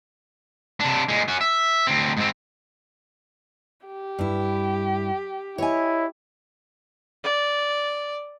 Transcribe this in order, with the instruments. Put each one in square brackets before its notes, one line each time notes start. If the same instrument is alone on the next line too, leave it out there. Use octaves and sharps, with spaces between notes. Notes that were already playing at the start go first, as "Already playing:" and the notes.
[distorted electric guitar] C3 D4
A#2 G#3
C#4 F#4
E5
D2 C4
G#2 C4
[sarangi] G4
[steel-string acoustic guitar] G2 E4
[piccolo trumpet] E4 [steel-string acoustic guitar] C#5 D#5 G#5
[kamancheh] D5